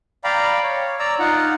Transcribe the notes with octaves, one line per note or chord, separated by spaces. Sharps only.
D5 F5 G5 A#5 B5
C#5
D5 A#5 E6
D#4 F4 F#5